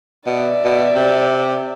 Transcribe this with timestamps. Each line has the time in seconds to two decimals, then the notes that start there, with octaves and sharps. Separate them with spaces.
0.26 B2 D5 E5
0.65 B2
0.95 C3